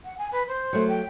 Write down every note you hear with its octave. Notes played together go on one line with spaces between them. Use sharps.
F#5
G#5
B4
C5
F#3 A3
G5